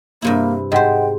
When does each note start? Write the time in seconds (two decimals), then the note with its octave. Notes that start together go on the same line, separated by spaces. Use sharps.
0.22 G2 C3 A#3 E4
0.72 G#2 C5 D#5 F#5 G5